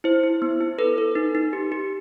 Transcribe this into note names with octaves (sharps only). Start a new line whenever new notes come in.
E4 C5
E4
B3
E4
A4 B4
A4
D#4
D#4
G4
G4